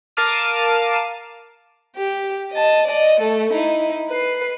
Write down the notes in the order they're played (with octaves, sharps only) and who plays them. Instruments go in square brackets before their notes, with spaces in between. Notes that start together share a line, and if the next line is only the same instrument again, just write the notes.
[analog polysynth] A#4 F5 A5 D6 F6 D#7
[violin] G4
D#5 A5
D5 D#5
A3 A4
D#4 E4
B4 C7